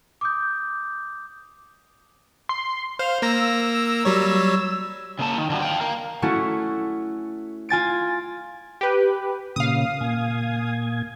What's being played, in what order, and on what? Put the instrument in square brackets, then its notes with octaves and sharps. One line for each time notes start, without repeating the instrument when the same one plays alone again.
[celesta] D6 D#6 G6
[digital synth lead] C6
[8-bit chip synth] C5 [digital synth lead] F5
[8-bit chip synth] A#3 A#5 A#6 [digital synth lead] E6
[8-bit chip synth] F#3 G3 C#5
[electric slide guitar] C#3 A#3 A5
D#3
D3 F3 G3 F#4
F5 G5
A#4 F5
[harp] A3 C#4 E4 F#4
F4 G#5 A6 D7
[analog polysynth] G4 B4
[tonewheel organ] A#2 C#3 [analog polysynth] F5 D#6
[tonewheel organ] A#2 G#5